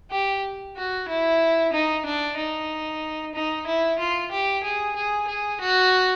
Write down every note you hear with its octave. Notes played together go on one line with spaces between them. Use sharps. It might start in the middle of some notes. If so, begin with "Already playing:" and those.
G4
F#4
E4
D#4
D4
D#4
D#4
E4
F4
G4
G#4
G#4
G#4
F#4